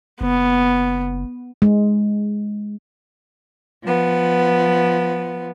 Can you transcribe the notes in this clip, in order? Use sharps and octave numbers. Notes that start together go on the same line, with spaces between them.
F#1 B3
G#3
F3 B3